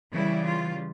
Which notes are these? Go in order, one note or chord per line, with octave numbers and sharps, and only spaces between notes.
C#3 E3 G3 E4
F4